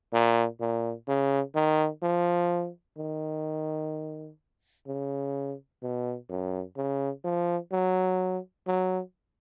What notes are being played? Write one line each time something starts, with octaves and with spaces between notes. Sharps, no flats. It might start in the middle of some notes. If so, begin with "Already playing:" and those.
A#2
A#2
C#3
D#3
F3
D#3
C#3
B2
F#2
C#3
F3
F#3
F#3